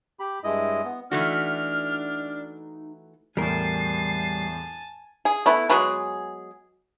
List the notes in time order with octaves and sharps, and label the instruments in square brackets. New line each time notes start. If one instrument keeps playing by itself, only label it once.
[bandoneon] G4 B5
G2 G#3 E4 D#5
B3
[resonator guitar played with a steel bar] E3 A3 F#4 [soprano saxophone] D4 [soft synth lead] D#4 [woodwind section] F6
[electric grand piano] E2 A2 [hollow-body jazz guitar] G3 A#4 [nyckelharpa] G#5 A5 [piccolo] C7
[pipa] G#4
A3 B3 E4
F#3 G#3 B3 G#4